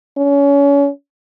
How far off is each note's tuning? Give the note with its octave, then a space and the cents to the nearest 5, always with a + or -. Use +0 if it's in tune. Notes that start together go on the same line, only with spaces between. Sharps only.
C#4 +30